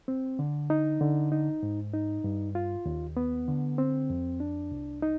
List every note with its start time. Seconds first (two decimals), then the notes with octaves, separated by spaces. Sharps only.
0.08 C4
0.39 D3
0.70 D#4
1.01 D3
1.32 D#4
1.63 G#2
1.94 D#4
2.24 G2
2.55 F4
2.86 D#2
3.17 B3
3.48 D3
3.78 C4
4.10 F2
4.40 D4
4.71 C2
5.02 D#4